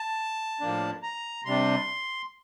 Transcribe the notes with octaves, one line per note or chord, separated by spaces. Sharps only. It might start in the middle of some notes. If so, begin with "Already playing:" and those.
Already playing: A5
A2 F3 A#3 D4
A#5
C3 G3 D4 C6